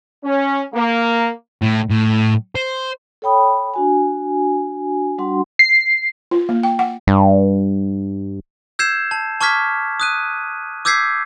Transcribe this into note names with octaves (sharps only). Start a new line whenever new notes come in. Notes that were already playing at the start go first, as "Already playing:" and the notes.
C#4
A#3
A2
A2
C5
A4 C#5 G5 B5 D#6
D4 F#4 G#5
G3 D4 F#4 F#5 C6
C7
F4
A#3
G5
F#5
G2
E6 G6 G#6 C7 E7
A5
A5 C#6 D6 F6 G#6 B6
D#6 F#6 D#7
D6 E6 G6 G#6 B6 C7